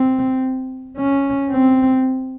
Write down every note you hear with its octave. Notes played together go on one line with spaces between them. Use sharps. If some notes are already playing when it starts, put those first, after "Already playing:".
Already playing: C4
C#4
C4